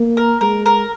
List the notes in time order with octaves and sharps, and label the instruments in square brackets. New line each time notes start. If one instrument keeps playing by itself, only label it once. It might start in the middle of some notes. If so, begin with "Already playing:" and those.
Already playing: [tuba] A#3
[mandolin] A#4
[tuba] G#3 [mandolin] A#4
[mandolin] A#4